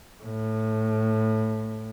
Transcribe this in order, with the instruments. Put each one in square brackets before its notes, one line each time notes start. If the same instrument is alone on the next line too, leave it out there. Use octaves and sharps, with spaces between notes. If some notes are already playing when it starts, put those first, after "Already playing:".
[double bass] A2